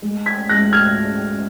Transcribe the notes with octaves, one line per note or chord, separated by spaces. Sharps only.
G#3
G#6 B6
C#2 F#6 A#6
F6 G#6